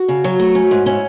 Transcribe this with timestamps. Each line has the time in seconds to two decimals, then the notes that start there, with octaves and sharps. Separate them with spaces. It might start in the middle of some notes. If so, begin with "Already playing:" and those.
Already playing: F#4
0.08 C#3
0.24 F#3
0.40 A3
0.55 C#4
0.71 G#2
0.86 C#4 E4